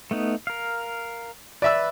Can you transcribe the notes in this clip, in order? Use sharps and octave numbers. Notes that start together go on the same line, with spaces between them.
A3 B3 D#4
A#4 F5
B4 D5 E5 E6